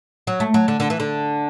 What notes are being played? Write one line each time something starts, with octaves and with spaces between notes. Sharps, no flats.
F#3
A3
F#3
D3
D3
E3
D3